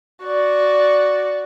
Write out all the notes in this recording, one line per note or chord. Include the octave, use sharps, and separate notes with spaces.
F#4 D5